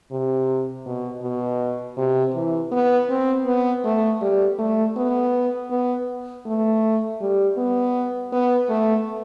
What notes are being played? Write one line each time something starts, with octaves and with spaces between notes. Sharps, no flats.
C3
B2
B2
C3
E3
B3
C4
B3
A3
G3
A3
B3
B3
A3
G3
B3
B3
A3